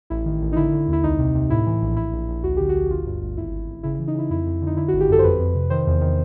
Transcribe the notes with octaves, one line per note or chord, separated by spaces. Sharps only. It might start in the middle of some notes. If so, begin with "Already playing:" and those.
A1 E4
D#3
A1
D#4
D3 E4
D3
D#2
E4
C2 D#4
C3
C3
A2 E4
E3
A#1
A#1 E4
A#1
A#1
D2 F#4
D3 G4
F#4
D2
G1 F4
G2
G1
G#1 E4
G#1
G#1
C#3 E4
E3 E4
D#4
C#3 E4
F2 E4
F2
D3
D#4
D3 E4
G#1 F#4
G4
F#2 A4
C5
F2 B4
F2
C3
D#3 C5
E2
D#3